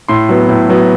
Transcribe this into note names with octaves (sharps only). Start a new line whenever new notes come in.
A2 C6
F#3 B3
A2
F#3 B3